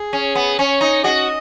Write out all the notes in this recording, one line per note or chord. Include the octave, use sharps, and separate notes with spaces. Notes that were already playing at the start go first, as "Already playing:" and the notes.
Already playing: G#4
C#4
B3
C#4 C#5
D#4
F#4 G#4 D#5